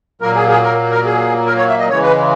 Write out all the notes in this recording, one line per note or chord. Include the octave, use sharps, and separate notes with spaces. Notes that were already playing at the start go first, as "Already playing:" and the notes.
A#2 F#3 A#3 A#4
G#4
G#4
A#4
A#4
G#4
A#4
C#5
E5
D#5
C#3 E3 G#3 C#5
B4